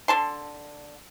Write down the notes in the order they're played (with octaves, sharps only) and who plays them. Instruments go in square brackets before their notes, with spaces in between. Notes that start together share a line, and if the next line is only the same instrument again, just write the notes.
[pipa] D3 A5 C6